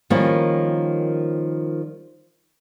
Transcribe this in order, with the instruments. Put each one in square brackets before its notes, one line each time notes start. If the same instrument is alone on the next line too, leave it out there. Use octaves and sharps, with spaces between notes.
[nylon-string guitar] D#3 F3 G3 A#3 C#4